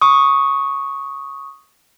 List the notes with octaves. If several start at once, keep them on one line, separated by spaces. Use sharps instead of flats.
C#6 D#6